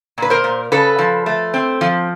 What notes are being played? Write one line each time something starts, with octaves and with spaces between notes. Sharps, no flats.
A#2 B4
A#4 C5
A#2
C#3 A4 B4
F3
A3
C4
F3